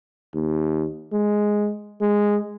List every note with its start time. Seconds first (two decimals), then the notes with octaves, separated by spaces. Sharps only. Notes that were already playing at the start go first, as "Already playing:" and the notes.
0.34 D#2
1.13 G#3
2.01 G#3